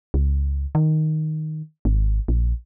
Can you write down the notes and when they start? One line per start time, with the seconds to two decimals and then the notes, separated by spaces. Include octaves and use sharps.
0.14 C#2
0.75 D#3
1.85 G#1
2.28 A#1